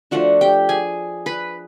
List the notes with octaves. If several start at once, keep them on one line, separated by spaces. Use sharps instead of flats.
F3 A3 D4 F#4 F#5
G4 G5
G#4 G#5
B4 B5